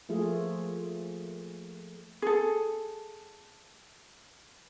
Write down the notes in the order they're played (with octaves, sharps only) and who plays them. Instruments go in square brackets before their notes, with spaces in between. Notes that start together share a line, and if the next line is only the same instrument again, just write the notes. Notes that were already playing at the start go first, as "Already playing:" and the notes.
[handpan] F3 A3 A#3 F4 G#4
[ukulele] G#4 A4